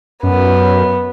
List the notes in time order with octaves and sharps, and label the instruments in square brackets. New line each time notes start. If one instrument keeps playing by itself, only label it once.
[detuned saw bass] F#2 [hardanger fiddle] B3